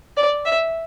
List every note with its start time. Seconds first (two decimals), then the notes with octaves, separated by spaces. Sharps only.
0.17 D5
0.45 E5